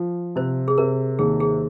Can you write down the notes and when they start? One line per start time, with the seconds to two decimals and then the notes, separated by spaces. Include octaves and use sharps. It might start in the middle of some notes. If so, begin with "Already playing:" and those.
Already playing: F3
0.36 C3 C5
0.68 G#4
0.78 C3 A#4
1.19 D#2 G#4
1.40 G#4